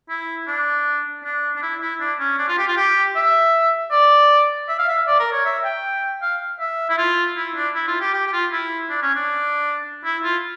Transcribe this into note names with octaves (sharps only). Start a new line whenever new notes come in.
E4
D4
D4
D4
E4
E4
D4
C#4
D4
F4
G4
F4
G4
E5
D5
E5
F5
E5
D5
A#4
C#5
E5
G5
F5
E5
E4
F4
E4
D4
E4
F4
G4
G4
G4
F4
E4
D4
C#4
D4
E4
F4